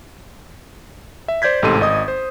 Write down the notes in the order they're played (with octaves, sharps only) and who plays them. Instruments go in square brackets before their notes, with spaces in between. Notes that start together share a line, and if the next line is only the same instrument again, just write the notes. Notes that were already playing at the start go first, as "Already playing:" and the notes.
[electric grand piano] E5
C5 D5 G6 G#6 B6
A1 G#2 C3 A4 C6 D#7
G#1 D#5 D#6
C5